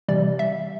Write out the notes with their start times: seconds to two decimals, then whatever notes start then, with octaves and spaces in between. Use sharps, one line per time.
0.08 C3 E3 G3 D5
0.39 E5